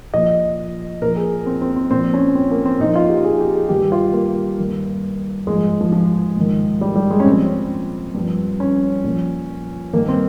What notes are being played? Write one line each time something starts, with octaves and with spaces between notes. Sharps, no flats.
A#2 F3 D#5
A#2 F3 A#4
G#4
C4
C4
C4
A#2 F3 C4
C#4
C4
A#3
C4
A#2 F3 D#4
F4
G4
G#4
G4
G#4
G2 D#3 G4
F4
A#3
G2 D#3
G#2 F3 G#3
F3
F3
G#2 D#3
G3
G3
G#3
C#4
A#2 F3 C4
G2 F3
C#4
A#2 F3
G2 D#3 A#3
C4